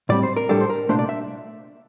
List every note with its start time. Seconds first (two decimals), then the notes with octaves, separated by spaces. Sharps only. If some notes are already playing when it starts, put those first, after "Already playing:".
0.09 A2 G3 C4 D5
0.23 C5
0.37 A#4
0.49 A2 G3 D4 A4
0.61 C5
0.70 A#4
0.89 C2 A#2 A3 D4 C5
0.99 D5
1.09 E5